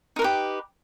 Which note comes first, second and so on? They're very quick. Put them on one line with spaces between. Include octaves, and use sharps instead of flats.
D#4 A#4 B4 G4